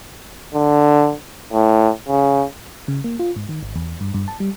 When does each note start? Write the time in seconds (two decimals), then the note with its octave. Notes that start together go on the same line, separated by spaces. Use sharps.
0.54 D3
1.53 A2
2.08 C#3
2.88 C#3
3.04 A#3
3.19 F4
3.36 G#2
3.49 D#3
3.63 G#1
3.76 E2
4.01 G2
4.14 G2
4.28 A5
4.40 G3